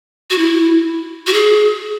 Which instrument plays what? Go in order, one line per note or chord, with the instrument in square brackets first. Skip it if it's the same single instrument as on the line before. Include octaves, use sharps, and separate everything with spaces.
[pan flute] F#4
E4
F#4
G#4